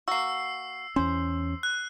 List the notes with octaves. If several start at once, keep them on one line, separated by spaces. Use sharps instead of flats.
A#3 F#4 E6 C7
E2 C#4 C5
F#6